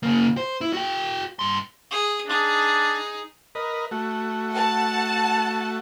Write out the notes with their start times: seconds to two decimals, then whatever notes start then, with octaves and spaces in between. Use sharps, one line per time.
0.03 C#3 A#3
0.37 C5
0.61 E4
0.73 F#4 G5
1.39 G2 C6
1.91 G#4
2.27 D4 D#4 G#4
3.55 A#4 B4 D#5
3.91 A3 F#4
4.52 F#5 A5